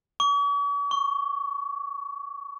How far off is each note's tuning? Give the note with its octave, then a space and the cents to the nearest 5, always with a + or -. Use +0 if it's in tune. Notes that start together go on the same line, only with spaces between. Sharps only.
C#6 +45
C#6 +5